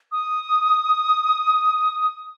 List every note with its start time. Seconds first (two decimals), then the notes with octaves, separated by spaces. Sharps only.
0.12 D#6